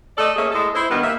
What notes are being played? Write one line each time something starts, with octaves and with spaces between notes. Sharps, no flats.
A3 A4 D5 D#5
A#3 C#4 G#4 E5
A2 G#3 A4
E4 C5
G2 D#3 B3
A#3 E5